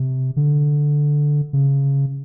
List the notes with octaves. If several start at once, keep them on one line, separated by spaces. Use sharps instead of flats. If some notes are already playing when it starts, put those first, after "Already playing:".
Already playing: C3
D3
C#3